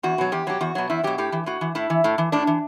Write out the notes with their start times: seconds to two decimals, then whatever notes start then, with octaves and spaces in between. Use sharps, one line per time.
0.03 E2 F#4
0.18 B2 F#3
0.32 E2 G4
0.47 B2 F#3 G4
0.61 E2 F#4
0.75 B2 F#3
0.90 E2 E4
1.04 B2 F#3 G4
1.18 A2 G4
1.32 E3
1.46 A2 F#4
1.61 E3
1.75 A2 E4
1.90 E3
2.04 A2
2.18 E3
2.32 A2 D4
2.47 E3